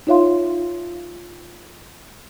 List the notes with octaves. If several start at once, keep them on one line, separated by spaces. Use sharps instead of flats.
D#4 F4 C#5 E5 F5 C6